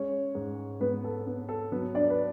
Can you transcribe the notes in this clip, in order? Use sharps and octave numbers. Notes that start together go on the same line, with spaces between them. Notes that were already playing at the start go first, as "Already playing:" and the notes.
Already playing: G#3 C#4 C#5
G#2
G#2 B3 B4
A4
B3
A4
F#3 B3 B4
D4 D5
B4